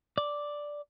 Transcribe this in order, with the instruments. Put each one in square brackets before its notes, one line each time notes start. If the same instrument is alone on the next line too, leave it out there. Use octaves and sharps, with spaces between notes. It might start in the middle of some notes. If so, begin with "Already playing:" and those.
[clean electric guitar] D5